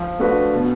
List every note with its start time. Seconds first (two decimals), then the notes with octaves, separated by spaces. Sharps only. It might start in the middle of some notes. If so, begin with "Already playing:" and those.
Already playing: F3
0.19 A3 D4 F#4 B4
0.54 B2